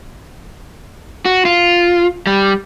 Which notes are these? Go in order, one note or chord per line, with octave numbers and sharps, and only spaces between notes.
F#4
F4
G3